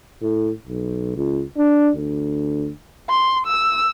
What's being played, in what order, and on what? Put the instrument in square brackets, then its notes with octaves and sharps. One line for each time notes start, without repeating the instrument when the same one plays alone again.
[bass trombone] A2
B1
C#2
D4
D2
[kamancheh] C6
E6